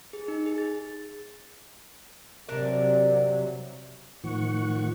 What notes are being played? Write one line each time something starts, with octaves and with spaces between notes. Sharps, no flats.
G#4
D#4
G#4
A6
C3 F#3 D4 A#4 D5
A2 D#3 F3 F#5 C#6